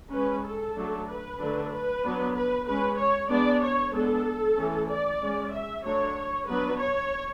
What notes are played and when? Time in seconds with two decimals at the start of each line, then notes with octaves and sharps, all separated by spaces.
0.12 G#3 C#4 B4
0.44 A4
0.75 F#3 A3 D4
1.07 B4
1.39 D3 F#3 A3 D4
1.70 B4
2.03 F#3 B3 D4
2.34 B4
2.66 G#3 C#4 B4
2.98 C#5
3.29 G#3 B3 D4 D5
3.62 C#5
3.93 G#3 B3 D4 A4
4.57 E3 A3 C#4
4.89 D5
5.20 G#3 C#4
5.51 E5
5.83 F#3 A3 D4 C#5
6.47 F#3 B3 D4 B4
6.79 C#5